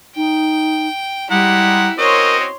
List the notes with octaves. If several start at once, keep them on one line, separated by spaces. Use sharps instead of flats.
D#4 G5
G3 G#3 E4 G4 F#5 A#5
C4 C#4 F#4 A#4 C#5 D#5 C6